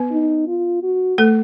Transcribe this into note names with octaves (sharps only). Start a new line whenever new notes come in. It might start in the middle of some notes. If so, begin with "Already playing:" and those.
Already playing: B3 B4
D#4
F4
F#4
A3 A4